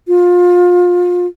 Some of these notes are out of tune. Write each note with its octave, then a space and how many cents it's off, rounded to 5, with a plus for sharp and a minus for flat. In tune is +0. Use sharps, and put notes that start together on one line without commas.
F4 +25